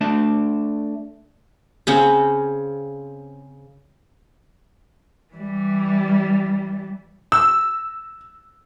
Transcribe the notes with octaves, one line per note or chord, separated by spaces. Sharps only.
A3 D4 A5
C#3 C4 C#4
E3 G3
E6